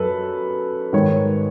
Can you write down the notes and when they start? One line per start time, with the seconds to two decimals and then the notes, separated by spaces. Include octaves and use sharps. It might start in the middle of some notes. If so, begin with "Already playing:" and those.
Already playing: F#2 A4 B4
0.93 G#2 D#3 C#5